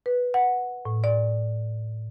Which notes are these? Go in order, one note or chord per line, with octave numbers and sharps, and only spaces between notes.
B4
F#5
A2
D5